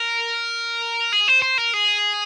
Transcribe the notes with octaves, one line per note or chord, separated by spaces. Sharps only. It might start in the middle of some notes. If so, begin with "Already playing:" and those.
Already playing: A#4
G#4
C5
C5
A#4
G#4